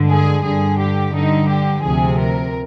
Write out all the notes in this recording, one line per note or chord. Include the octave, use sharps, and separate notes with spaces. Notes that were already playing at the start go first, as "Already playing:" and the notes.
Already playing: G2 D3 G#3
G#4
G2 D3 G3 G#4
G4
G2 D3 G3 D#4
G4
D2 C3 F3 G#4
A#4